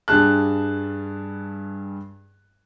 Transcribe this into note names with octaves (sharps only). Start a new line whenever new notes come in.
G2 G3 G#4 A5 F#6